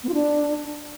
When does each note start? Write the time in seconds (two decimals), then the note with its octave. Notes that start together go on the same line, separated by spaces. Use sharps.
0.04 B3
0.09 F4
0.14 D4